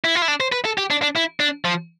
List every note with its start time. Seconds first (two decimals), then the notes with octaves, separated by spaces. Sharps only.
0.04 E4
0.15 F4
0.22 E4
0.28 D4
0.40 C5
0.52 B4
0.65 A4
0.78 G4
0.90 D4
1.02 D4
1.16 E4
1.40 D4
1.65 F3